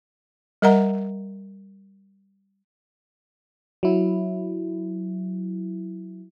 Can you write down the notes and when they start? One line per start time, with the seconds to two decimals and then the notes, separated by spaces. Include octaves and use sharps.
0.62 G3 A#4 D#5 F#5 A#5
3.83 F#3 E4